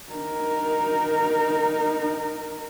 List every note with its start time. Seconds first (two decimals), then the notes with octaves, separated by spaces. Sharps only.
0.13 D#4 A#4